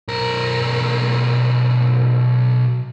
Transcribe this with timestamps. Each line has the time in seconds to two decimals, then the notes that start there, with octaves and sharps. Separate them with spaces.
0.08 B1 A#4